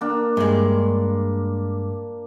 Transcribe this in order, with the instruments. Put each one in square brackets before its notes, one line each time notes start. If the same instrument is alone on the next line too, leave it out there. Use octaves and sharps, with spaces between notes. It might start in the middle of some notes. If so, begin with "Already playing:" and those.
[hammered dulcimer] A#3 D4
[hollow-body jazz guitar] G2 G#3